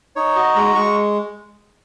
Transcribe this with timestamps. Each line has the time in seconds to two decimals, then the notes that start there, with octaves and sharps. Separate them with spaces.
0.16 D#4 C#5
0.36 F#4 D#5
0.55 G#3 A#5
0.75 G#3 C#6